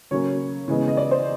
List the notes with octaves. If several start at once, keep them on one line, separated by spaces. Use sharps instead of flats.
C#3 F#3 A#3 C#4 C#5
C#3 E3 G#3 B3
D#5
D5
C5